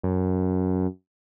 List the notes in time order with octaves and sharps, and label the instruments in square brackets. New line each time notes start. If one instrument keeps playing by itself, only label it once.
[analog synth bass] F#2